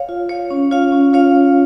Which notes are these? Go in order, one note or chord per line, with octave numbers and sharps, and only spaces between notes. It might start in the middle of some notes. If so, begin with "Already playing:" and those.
Already playing: C#5 F5
F4
C#5 F5
C#4
F4 C#5 F5
C#4
F4 C#5 F5